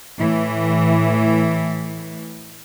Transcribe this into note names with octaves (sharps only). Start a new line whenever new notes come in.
A2 E3